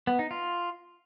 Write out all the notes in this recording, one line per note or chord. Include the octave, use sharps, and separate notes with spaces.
B3
D#4
F4